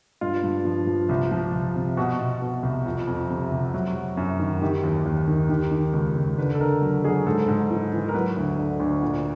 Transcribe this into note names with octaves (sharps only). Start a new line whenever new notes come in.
G2 F4
G2
F3
F3
C2
F3
C2
C3
B2 F#4
B2
B2
C2
F2
F2
C3
C3
F#3
F#3
F#2
D#3
D#3 G4
D#2
D#2
D#3
D#3 G4
D#3
C#2
C#2
D3 B4
A4
D3 A#4
F#3
F#3 G#4
G#2 A4
G#2
E3
E3
A#4
F#3 B4
D2
D3
D2
A#2